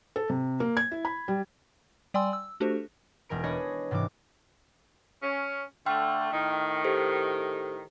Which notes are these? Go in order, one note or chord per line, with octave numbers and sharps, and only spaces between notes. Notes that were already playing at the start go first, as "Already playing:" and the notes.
A4
C3
A#3
G#6
E4
B5
G3
G3 D5 G5 G#5 C6 E6
E6
A3 D4 F#4 G4 A4 C5
E1 G#3 A#4 D7
D4 G#4 B4 C#5 D#5
G#2 C3 E3 G#3 D6
C#4
D3 A3 G5 C6 F6
A2 D#3
G4 A4 C5